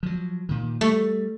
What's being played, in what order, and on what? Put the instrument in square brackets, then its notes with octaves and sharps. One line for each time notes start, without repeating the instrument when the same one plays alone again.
[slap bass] F3 F#3
A#2 D#3
[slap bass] G3 [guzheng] A3